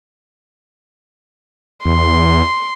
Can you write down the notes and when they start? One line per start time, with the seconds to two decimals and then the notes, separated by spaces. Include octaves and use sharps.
1.85 E2 C6